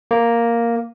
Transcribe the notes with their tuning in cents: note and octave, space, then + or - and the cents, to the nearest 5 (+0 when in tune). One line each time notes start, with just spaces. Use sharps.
A#3 +0